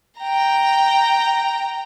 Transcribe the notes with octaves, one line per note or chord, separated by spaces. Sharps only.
G5 A#5